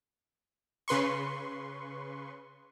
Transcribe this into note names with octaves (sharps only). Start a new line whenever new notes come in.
C#3 B4 C6 C#6